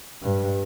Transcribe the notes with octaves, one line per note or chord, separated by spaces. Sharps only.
G2